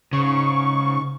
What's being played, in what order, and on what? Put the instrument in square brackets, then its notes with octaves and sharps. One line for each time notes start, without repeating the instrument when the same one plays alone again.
[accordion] G#2 C#6 [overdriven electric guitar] C#3